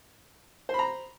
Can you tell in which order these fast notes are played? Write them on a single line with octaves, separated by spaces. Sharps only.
C5 B5 A#5